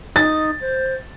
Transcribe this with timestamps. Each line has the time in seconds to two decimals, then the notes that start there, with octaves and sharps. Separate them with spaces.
0.16 D#4 A6
0.61 C5